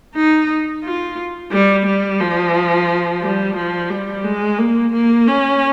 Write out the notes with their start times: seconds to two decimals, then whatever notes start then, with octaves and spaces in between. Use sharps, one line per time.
0.15 D#4
0.83 F4
1.52 G3
1.86 G3
2.20 F3
3.22 G3
3.56 F3
3.90 G3
4.24 G#3
4.58 A#3
4.93 A#3
5.27 C#4